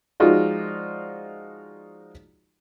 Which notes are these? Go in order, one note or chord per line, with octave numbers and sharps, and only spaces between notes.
F3 G#3 D#4 F4 F#4 D5